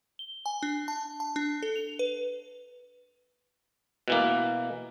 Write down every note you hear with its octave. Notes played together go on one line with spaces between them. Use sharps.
G7
G#5
D4
A5
A5
D4
A4
F7
B4
B2 E3 A#3